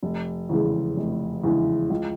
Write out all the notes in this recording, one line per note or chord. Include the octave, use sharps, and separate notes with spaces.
F1
E2 C#3 E3 G#3
F1
E2 C#3 E3 G#3
C#2